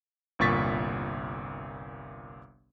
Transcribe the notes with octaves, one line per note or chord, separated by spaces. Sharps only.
G1 C2 A#2 C#6 A6 B6